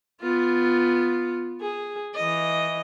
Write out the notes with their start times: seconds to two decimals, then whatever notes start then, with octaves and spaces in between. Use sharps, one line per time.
0.21 B3 F4
1.61 G#4
2.15 E3 D#5